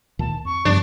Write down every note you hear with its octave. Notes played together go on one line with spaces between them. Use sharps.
D2 A#2 D#3 A5
F2 C#6
G2 C#3 F3 B3 D4